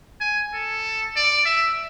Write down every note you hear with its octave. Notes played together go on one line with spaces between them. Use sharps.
G#5
A4
D5
E5